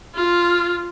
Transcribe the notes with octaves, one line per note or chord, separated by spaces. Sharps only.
F4